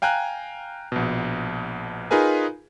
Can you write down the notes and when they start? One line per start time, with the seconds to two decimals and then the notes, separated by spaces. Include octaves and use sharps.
0.02 F5 G5 G#5 A#5 F#6
0.92 A#1 B2
2.11 D#4 F4 G#4 A#4 B4 G#5